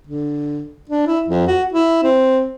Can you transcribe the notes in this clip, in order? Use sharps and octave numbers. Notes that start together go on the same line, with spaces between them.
D3
D4
E4
F2
F#4
E4
C4